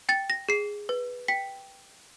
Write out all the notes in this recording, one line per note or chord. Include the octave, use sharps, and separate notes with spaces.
G5 A6
A#6
G#4 C7
B4
G5 B6